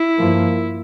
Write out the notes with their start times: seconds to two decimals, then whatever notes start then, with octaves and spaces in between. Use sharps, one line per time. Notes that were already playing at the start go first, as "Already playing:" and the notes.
Already playing: E4
0.17 G2 F3 A#3